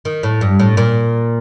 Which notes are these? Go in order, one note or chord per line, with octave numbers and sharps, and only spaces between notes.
D#3
A2
G2
A2
A#2